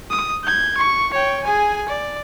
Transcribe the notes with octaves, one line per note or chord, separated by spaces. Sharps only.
D#6
G6 G#6
C#6
C#5 G5
G#4 G#5
D5